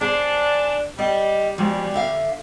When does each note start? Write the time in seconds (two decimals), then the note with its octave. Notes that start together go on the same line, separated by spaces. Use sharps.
0.01 D4 G#4 C5
0.99 G3 D#5
1.58 B2 F3 G3 G#3
1.94 D3 E5 F5